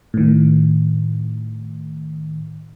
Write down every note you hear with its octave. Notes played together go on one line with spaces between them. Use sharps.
A2 D#3